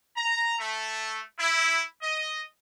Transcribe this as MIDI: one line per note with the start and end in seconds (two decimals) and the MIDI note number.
0.17 0.56 82
0.59 1.20 57
1.39 1.80 64
2.02 2.41 75